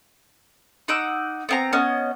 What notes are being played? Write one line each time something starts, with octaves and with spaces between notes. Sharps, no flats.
D#4 F#5 D6 E6
B3 C4 A#5
B3 C#4 D#5